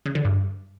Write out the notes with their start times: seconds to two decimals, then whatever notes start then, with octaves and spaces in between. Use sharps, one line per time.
0.06 C#3
0.15 D3
0.25 G2